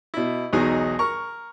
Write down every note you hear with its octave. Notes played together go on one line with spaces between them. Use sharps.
B2 E4
B1 E2 F#3 D#4 G#4
A#4 C#6